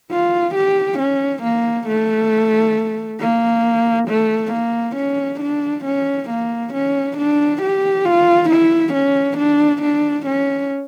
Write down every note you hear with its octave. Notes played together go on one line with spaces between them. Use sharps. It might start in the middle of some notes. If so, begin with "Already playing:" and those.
F4
G4
C#4
A#3
A3
A#3
A3
A#3
C#4
D4
C#4
A#3
C#4
D4
G4
F4
E4
C#4
D4
D4
C#4